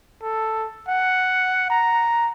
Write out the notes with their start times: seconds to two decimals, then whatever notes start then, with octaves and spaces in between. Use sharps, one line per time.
0.23 A4
0.88 F#5
1.70 A#5